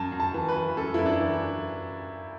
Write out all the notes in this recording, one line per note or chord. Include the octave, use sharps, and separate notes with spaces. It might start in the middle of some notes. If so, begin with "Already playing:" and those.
Already playing: F#2 A5
F#2
A5
E3
B4
E3
F#2 A4
F#2 E4
D4
E3